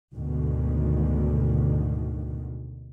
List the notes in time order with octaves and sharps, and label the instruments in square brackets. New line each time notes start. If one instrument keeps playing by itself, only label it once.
[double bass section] D2 G#2 B2 D3 D#3